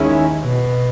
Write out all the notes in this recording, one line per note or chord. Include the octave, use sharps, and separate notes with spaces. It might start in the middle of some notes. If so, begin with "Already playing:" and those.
Already playing: D#2 D#3 G#3 C#4 E4
B2